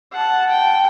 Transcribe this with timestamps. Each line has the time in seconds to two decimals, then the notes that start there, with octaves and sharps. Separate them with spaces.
0.13 F#5 A5
0.50 G5